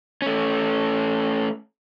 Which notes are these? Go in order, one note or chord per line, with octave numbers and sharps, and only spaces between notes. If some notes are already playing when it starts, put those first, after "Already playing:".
A3 C#4